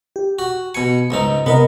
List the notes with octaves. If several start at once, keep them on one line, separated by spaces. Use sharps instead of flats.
G4
F#4
B2 G#5 C#7
C#2 G#2 D#4
C3 B3 A#4 D#5